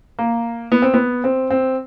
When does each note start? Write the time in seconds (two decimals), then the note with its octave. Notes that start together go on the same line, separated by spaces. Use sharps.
0.19 A#3
0.72 B3
0.82 C4
0.94 B3
1.24 C4
1.50 C4